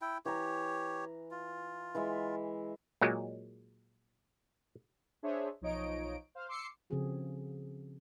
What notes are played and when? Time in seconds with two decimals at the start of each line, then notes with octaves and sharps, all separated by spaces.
0.01 E4 G5
0.25 E3 G4 C#5 A#5
1.31 F4
1.95 E3 G#3 E5
3.01 A#2 F#3 G#3
5.23 D4 G#4 C5 C#5 E5
5.61 B1 F3 D#4 C#5 D#5 D7
6.35 C5 F5
6.48 C6 D6 E6 C7 C#7
6.90 C#3 F3 C4 F#4 G#4 A4